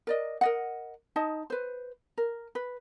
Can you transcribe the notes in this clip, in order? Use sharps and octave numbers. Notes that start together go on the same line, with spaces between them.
A#4 D5 D#5
A#4 D#5 F#5
D#4 D#5 A5
B4 C5
A#4
B4